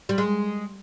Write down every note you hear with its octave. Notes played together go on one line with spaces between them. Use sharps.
G3
G#3